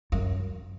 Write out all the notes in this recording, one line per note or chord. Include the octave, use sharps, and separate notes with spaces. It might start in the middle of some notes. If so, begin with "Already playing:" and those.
F#2